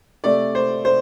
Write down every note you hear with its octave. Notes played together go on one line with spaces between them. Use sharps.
C3 A3 D5
C5
C5